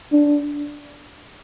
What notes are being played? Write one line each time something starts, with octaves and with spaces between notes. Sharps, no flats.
D4